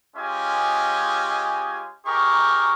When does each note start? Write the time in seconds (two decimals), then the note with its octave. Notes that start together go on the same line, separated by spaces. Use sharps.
0.17 G#3 C#4 F4 G4 D#5 G#5
2.06 D#4 G4 G#4 A#4 C#6